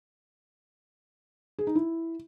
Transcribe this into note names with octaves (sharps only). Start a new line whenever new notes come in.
G#4
D#4
E4